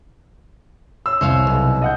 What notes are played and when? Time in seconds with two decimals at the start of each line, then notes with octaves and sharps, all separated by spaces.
1.06 C#5 E6
1.21 C2 C5 C#5 F5
1.47 B1
1.82 D#5 F#5 G6